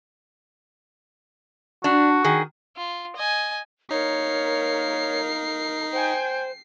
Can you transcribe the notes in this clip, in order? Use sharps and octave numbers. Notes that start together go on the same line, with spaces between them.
D4 F#4
D#3 G#4
F4
D#5 G#5
A#3 D#4 A#4 C#5 C7
C5 G5 G#5